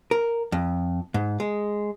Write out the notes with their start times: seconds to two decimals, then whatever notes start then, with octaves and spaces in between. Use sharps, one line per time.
0.11 A#4
0.52 F2
1.14 G#2
1.40 G#3